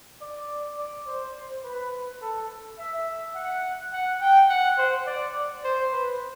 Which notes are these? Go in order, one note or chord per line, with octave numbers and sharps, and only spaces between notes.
D5
D5
C5
B4
A4
E5
F#5
F#5
G5
F#5
C5
D5
C5
B4